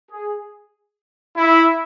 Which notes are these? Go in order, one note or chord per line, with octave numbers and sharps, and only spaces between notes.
G#4
E4